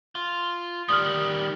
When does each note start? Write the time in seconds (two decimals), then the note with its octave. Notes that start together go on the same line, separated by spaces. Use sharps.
0.15 F4
0.89 D#3 G3 D#6 F6